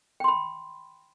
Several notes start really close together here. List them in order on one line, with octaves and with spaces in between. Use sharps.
G5 C6 B5